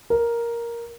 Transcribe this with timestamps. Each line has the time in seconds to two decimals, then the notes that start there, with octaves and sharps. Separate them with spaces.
0.10 A#4